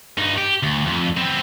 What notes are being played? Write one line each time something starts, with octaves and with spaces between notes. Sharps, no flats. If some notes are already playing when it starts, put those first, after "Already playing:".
G2 D#4
G4
D2
F2
B3 C4